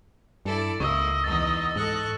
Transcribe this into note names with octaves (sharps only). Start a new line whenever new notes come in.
G2 E4 A4 D5
C#2 A#3 E4 D#5 C#6 E6
E2 D#4 A6
G#2 A4 C#6 F#6